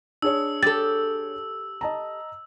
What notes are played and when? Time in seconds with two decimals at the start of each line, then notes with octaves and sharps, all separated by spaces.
0.22 D4 G#4 C#5 E6
0.63 G4 A4 A6
1.81 D#5 A5 A#5